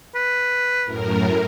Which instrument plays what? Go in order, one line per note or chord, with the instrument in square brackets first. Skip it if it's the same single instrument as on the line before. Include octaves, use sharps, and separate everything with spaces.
[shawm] B4
[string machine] F#2 A2 A#4